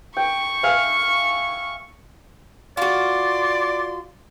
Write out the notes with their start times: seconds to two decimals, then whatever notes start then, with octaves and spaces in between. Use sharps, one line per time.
0.17 G5 C#6
0.63 E5 F5 G#5
2.77 F4 F#4 D5 C6